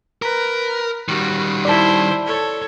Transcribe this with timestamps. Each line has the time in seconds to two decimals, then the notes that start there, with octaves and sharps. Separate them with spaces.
0.22 A#4 B4 A#5
1.08 D#3 G3 F#4
1.65 E4 C5 D5 A5
2.26 A4 C#5